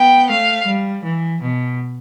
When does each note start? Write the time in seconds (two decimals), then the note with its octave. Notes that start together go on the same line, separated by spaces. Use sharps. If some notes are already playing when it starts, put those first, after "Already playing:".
Already playing: B3 G5
0.30 A3 F5
0.67 G3
1.04 E3
1.42 B2